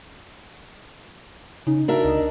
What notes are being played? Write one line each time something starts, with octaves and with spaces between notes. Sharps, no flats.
C#3 D#4
D4 F#4 A#4 E5
C#2 D#5